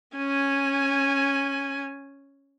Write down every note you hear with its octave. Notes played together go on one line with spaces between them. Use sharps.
C#4 G#5